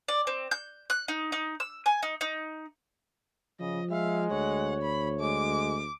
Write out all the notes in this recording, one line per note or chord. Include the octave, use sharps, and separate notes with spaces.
D5
C4
G6
F#6
D#4
D#4
E6
G#5
D#4
D#4
C#3 F3 D#5
G#3 E5 F5
D2 C#5 F#5
B5
G#3 D6